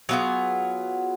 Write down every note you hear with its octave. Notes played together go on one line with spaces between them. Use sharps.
F#3 B3 F4 G#4